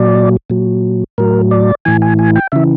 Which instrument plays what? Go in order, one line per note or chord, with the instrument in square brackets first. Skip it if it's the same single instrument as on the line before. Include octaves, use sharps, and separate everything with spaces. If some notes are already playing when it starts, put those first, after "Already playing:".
Already playing: [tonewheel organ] A#2 F#3 D5
A#2 F#3
A2 F#3 A#4
D5
A2 E3 G#5
G#5
G#5
G5
C#3 E3 E5